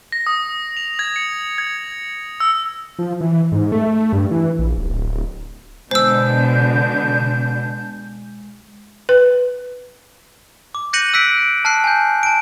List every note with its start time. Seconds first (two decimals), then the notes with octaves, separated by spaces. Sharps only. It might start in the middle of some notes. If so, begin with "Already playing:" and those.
0.12 A#6
0.27 D#6
0.77 F7
0.99 G#6
1.16 C#7
1.58 G#6
2.40 E6
2.99 F3
3.21 E3
3.52 G#2
3.72 A3
4.13 G2
4.31 E3
4.59 A#1
4.78 D1
5.91 B2 D3 G#3 C5 A5 E6 G6
9.09 B4
10.75 D6
10.93 F#6 G6 A#6 C#7 D#7 F#7
11.14 E6 F#6 B6 D7
11.65 A5 F6 F#6 C7
11.84 G#5 G6
12.23 A5 D7